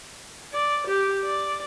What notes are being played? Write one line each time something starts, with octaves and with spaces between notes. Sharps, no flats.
D5
G4
D5